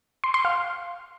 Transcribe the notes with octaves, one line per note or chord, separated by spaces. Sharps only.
C6
C6
F5